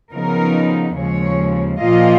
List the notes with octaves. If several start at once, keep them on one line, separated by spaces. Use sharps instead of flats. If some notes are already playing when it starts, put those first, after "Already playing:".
C#3 F3 B3 D#4 A#4
D#2 C#3 F3 G#3 C#5
A#2 F3 A#3 F4 D#5